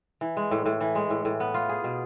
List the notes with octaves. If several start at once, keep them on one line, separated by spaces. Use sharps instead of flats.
E3
G#3
A2
A2
E3
G#3
A2
A2
B3
F4
G#4
B2